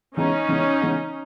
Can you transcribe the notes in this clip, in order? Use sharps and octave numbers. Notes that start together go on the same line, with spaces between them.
C#3 E3 G#3 B3 C#4 D#4
C#3 E3 G#3 B3
C#3 E3 G#3 B3